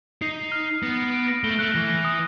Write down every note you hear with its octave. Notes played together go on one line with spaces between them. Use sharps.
D#4 C7
C7
F6
C7
B3 A#6
D7
D7
A#6
A3 G7
A3 F#6
E3 A#6
A#6
D#6